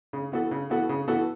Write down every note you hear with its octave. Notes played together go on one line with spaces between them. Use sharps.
C#3
E3 B3 F#4 A4
C#3
E3 B3 F#4 A4
C#3
E3 B3 F#4 A4